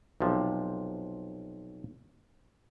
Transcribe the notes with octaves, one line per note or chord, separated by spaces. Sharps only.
B1 C3 F3